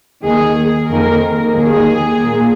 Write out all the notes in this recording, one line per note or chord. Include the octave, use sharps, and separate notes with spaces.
D#2 D#3 A#3 G#4
F2 D#3 A#3 A#4
D#2 D#3 A#3 G#4
A#2 A#3